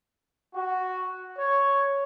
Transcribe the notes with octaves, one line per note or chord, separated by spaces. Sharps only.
F#4
C#5